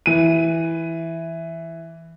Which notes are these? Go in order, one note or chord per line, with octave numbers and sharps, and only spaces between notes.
E3 D#7